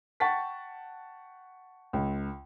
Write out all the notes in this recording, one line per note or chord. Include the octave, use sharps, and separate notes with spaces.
F#5 G5 A5 C#6 A6 B6
C#2